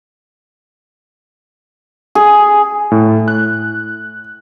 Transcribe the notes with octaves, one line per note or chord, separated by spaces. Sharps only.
G#4
A2
F#6